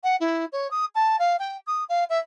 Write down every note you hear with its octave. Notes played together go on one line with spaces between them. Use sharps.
F#5
E4
C#5
D#6
A5
F5
G5
D#6
F5
E5